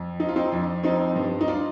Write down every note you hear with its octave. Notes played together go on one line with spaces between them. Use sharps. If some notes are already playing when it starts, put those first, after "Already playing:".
Already playing: F2
F3 D#4
F4
C4 D#4
F2 D4
F3 C4 D#4
G2
D#4
D4 F4